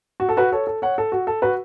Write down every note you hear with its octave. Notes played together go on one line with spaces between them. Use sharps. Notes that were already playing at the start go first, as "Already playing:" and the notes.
F#4
A4
F#4 B4
A4 C#5
A4
C#5 F#5
A4
F#4
A4
F#4 B4